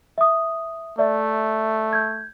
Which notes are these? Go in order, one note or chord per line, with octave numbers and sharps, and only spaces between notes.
E5 D#6
A3 D5 E5
G6 G#6